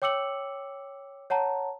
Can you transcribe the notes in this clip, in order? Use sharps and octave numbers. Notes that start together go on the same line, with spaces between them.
C#5 G5 D6 E6 C#7 F#7
C#5 F#5 A5 A#5